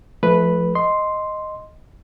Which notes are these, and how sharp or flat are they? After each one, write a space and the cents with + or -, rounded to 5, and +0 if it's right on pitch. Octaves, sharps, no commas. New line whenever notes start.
F3 -15 A3 -30 B4 +0
D#5 +0 C6 +0